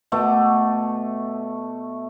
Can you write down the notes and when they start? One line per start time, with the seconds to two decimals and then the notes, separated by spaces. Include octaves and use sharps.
0.12 B2 A3 D6